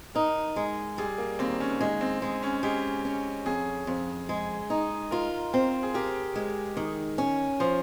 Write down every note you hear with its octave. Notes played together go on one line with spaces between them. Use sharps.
D#4 A#4
G#3
G3 G#4
A#3
D#2 C4
C#4
G#3 D#4
C4
G#3
C#4
G#3 G4
C#4
F2 G#4
F2
G#3
D#4
F4 A#4
C4 C5
G#4
G4 A#4
G#3
D#3
C#4
F3 C5